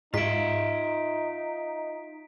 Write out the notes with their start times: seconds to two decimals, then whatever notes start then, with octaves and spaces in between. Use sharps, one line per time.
0.14 G#2 D#4 F4 E5 B6 D7